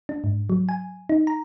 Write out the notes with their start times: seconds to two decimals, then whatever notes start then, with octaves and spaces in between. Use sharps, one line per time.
0.09 D4
0.24 G#2
0.50 F#3
0.69 G#5
1.09 D#4
1.27 A#5